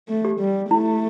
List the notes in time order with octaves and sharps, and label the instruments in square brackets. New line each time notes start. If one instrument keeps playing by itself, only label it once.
[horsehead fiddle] A3
[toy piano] G4
[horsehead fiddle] G3
[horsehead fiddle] A3 [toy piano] E4